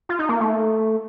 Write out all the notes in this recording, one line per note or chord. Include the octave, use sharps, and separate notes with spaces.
F4
D#4
A#3
A3